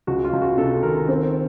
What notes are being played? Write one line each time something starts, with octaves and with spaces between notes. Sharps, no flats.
C#2 F#4
F4
C#2
F#4
C3 A4
D#3 A#4
C4